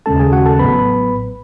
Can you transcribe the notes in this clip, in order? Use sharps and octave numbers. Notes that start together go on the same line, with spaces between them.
D#2 C#3 G#3 C#4 A4 A5
G#4 G#5
F#4 F#5
A4 A5
A1 A2 F#3 B3 B4 B5